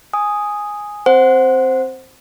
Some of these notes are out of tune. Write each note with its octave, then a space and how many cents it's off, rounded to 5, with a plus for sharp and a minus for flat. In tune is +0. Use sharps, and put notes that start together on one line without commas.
G#5 +0 D#6 +0
C4 +0 C5 +0 F#5 +0